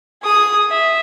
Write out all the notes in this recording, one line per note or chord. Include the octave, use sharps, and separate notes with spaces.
G#4 D#6
E5